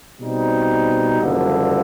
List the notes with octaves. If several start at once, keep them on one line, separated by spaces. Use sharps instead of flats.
B2 G3 C4 D#4
F#1 F2 D3 G3